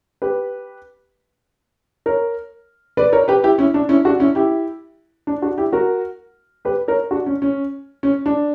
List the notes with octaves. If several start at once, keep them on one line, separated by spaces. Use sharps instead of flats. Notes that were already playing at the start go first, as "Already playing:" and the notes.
G4 B4
A#4 C#5
B4 D5
A#4 C#5
G4 B4
E4 G4
C#4 E4
D4
C#4 E4
D4 F#4
C#4 E4
E4 G4
D4
D4 F#4
E4 G4
F#4 A#4
G4 B4
A#4 C#5
D4 F#4
C#4
C#4
C#4
D4